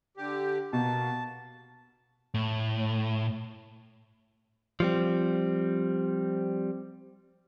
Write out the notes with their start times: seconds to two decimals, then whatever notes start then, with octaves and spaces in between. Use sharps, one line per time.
0.17 D3 G4
0.73 B2 A#3 A5
2.34 A2
4.80 F3 G3 C4